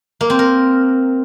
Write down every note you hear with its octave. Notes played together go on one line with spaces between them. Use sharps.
A#3
C4
A#4